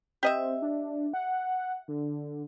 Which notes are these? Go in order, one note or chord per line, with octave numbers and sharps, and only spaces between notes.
C4 G4 D#5 E5
D4
F#5
D3